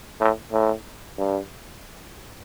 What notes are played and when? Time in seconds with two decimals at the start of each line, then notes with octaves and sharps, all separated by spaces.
0.20 A2
0.52 A2
1.18 G2